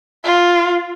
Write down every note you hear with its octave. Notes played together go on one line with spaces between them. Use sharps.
F4